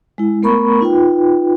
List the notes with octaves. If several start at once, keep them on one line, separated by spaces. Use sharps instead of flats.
G#3 E4
A3 B3 A#4 A#5 B5 C#6
D#4 F4 B4 G5